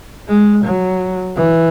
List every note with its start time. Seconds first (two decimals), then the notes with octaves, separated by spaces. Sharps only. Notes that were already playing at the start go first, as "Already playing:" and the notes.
0.29 G#3
0.65 F#3
1.36 E3